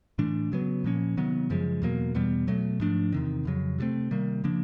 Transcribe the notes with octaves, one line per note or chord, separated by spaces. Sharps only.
A2 E3 A3 D4
C#3 F#3 B3
A#2 F3 A#3 C#4
C3 D#3 F#3 B3
F#2 C#3 F3 G#3
E2 B2 F#3 A#3
E2 B2 G3 B3
B2 F#3 A3
G#2 F3 A3 D4
E2 C3 D#3
F2 C#3 F#3
C3 F3 A3 C4
C3 D#3 G3 A#3
C#3 F3 A#3 D4